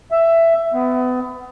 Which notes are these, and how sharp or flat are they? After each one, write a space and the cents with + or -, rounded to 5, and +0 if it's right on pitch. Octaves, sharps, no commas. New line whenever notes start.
E5 +10
B3 +30